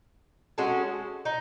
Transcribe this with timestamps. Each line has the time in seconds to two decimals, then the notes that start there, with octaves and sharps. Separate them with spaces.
0.58 G#3 C#4 F#4 A4
1.25 D#4